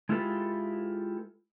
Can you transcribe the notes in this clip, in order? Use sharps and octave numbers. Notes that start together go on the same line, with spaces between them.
G#3 E4 F4 G4 A4 B4